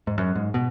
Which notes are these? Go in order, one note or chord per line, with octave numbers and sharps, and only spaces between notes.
G#2
F#2
G#2
B2